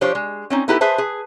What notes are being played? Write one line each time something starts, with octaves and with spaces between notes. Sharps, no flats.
F3 D4 G4 C5 C#5
G#3
C4 C#4 D#4
B3 D#4 E4 G4 A4 B4
G#4 B4 C5 E5 A5
G#4